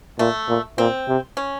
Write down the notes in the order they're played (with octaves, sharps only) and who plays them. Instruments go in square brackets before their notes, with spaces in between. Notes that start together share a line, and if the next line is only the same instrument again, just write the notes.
[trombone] A#2 [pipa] A3
[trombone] A#2
[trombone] A#2 [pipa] C4
[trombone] C3
[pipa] C#4